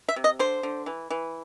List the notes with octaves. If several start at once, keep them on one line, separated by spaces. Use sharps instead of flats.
E5
C3
D#5
D3 C5
D3
E3
E3